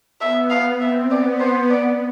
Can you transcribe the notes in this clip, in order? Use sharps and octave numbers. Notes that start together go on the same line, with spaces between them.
B3 E5
F5
C4 E5
B3 D5
C5
D5